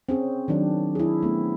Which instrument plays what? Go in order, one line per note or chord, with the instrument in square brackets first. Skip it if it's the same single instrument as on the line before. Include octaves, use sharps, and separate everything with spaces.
[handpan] C4 C#4 G#4
D#3 F#3 D4
E4 G#4
A3 B3